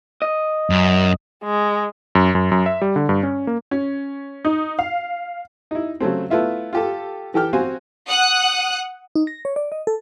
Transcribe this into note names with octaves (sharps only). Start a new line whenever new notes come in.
D#5
F#2
G#3
F#2
F#2
F#2
E5
G3
D3
G2
C#4
A#3
C#4
D#4
F5
D#4 E4
C#3 F#3 A3 C4
A3 B3 E4 F4 E5
F4 G4 A4
E3 G4 A4 G5 F6
C4 F#4 F5 G#5
F#5 D#6 F#6
D#4
A#6
C#5
D5
D#5
A4